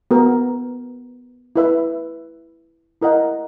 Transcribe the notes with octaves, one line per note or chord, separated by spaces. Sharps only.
B3 F#4 A#4
E4 B4 E5
E4 A#4 D#5 F#5